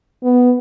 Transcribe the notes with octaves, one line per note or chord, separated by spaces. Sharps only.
B3